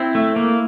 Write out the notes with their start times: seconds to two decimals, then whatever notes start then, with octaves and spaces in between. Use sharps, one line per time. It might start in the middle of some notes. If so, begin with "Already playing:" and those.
Already playing: C4 E4
0.15 A3
0.36 A#3